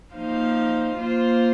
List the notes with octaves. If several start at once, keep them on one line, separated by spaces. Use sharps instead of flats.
F3 A#3 D#4 C5 F5
A#3 F4 C5